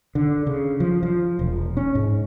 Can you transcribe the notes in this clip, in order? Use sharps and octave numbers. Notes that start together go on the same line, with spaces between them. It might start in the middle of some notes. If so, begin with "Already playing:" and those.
D3
C#3
F3
F3
E1
C#4
G#2